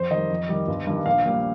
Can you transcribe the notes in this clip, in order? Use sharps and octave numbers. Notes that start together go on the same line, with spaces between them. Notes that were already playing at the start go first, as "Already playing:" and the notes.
Already playing: F2 C5
D#3 G3 D#5
F2
D#3 G3
G1
G2 D#3 G3
A#1 F5
A#2 G3